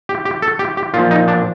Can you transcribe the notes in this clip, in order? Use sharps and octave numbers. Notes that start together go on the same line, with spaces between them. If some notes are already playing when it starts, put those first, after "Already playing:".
G4
G4
A4
G4
G4
A#2 F3 F4
D#4
D4